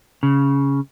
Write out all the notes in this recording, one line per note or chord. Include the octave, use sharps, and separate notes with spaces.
C#3